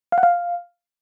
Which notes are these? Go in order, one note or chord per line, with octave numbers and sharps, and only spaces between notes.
F5
F#5
F5